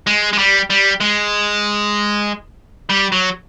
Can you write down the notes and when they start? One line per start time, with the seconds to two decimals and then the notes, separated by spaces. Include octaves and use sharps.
0.07 G#3
0.33 G#3
0.38 G3
0.70 G3
1.00 G#3
2.90 G3
3.12 F#3